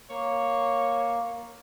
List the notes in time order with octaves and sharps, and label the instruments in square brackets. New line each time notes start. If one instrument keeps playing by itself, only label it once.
[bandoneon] A#3 [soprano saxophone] C#5